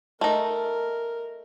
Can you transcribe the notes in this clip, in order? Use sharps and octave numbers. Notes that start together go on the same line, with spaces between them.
A3 D#4 A#4